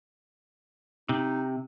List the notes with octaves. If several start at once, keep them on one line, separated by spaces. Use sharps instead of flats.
C3 D#4